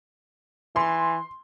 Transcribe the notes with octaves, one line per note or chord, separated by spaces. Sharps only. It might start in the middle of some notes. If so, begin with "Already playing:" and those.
E3 C6